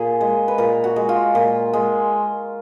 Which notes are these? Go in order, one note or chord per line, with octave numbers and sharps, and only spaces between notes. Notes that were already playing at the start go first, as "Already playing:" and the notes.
Already playing: A#2 G#4
G#3
B4
A#2 A#4
F#4
G#3
F4
A#2
G#3